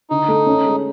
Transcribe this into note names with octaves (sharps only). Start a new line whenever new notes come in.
D3 D#4
A3
C#4
G#3